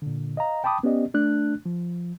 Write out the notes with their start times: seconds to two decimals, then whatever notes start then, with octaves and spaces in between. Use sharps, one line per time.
0.02 A#2 D3
0.37 D#5 F5 A#5
0.64 G5 A5 B5 D6 D#6
0.83 B3 C#4 G4 D5 D#5
1.14 A3 D4 F#6
1.66 F3